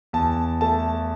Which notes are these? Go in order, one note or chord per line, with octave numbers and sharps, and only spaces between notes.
E2 A5
A3 A5